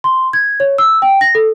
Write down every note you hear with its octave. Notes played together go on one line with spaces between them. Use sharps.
C6
G#6
C#5
E6
G5
A#6
A4